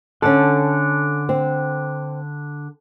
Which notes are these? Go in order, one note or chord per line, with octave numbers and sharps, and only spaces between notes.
D3 C#4 A4
C4